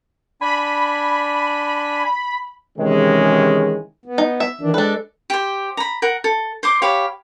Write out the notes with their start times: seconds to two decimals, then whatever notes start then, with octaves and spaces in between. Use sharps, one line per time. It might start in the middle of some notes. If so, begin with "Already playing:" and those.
0.41 D4 G#5 B5
2.78 C3 D#3 E3 G#3 C#4 G#4
4.06 B3
4.18 D#4
4.40 E5
4.61 D#3 E3 D4
4.74 G#3 D4 A4 B4
5.30 G4 C5
5.77 A#5 B5
6.02 A#4 F#5
6.24 A4
6.63 C5 C6 D6
6.82 G4 C#5 F5 B5